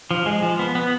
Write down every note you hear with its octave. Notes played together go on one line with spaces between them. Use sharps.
F3
G#3
F3
B3
B3